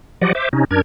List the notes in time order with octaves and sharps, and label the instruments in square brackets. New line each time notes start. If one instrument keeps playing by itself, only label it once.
[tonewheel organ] F3 F#3 G4 D5 D#5 F#5
C5 E5 D6
C3 C#4 D#4
F#2 D4 A#4 G#6